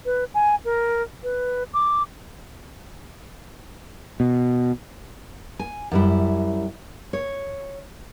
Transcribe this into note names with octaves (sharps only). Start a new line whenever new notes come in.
B4
G#5
A#4
B4
D6
B2
G#5
F#2 G3 E4
C#5